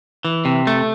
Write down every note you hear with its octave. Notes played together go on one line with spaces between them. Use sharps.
E3
C3
A3